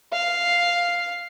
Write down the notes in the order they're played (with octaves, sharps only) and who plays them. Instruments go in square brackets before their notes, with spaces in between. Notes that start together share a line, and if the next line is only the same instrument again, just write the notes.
[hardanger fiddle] F5